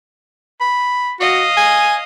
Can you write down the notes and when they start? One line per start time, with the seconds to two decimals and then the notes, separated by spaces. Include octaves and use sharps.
0.61 B5
1.20 F#4 D#5 F5
1.57 G#5